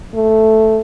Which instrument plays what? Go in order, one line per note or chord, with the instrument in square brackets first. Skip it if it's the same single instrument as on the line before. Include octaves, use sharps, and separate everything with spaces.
[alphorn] A3